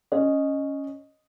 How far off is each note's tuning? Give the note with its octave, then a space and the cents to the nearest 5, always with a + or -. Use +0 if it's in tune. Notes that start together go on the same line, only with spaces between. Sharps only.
C#4 +0 D#5 -5